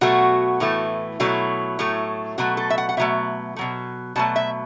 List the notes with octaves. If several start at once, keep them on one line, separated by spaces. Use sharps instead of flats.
B2 F#3 A3 F#4
A2 E3 A3
B2 F#3 A3 E4
A2 F#3 A3
B2 F#3 A3 F#4
A4
E5
F#5
F#5
B2 F#3 A3 E5
B2 F#3 A3
B2 F#3 A3 A5
E5